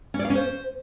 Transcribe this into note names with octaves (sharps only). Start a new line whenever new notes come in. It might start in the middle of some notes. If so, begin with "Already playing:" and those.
C#4
D5
F5
C#4
C5